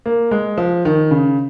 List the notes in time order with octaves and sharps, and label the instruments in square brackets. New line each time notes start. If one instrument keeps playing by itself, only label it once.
[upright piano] A#3
G#3
F3
D#3
C#3